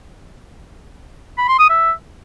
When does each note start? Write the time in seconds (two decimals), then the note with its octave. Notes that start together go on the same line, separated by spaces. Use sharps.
1.38 B5
1.49 C6
1.59 D#6
1.70 E5